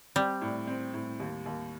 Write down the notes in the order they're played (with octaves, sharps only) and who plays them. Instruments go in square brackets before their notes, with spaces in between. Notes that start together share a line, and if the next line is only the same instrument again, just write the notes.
[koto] G3 [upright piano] C4
[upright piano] A2
C4
A2
D#2
D#2